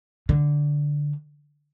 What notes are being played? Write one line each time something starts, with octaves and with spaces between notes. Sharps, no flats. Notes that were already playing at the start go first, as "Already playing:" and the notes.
D3